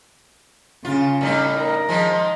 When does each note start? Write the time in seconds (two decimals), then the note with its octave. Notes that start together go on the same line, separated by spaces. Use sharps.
0.85 C#3 F4
1.21 A2 G3 D#4
1.58 A#4
1.89 D#3 F3 G#3